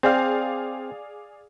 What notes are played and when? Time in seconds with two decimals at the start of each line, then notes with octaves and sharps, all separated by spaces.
0.03 C4 G#4 D5 F5